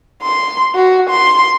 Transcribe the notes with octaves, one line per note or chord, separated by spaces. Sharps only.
C6
F#4
C6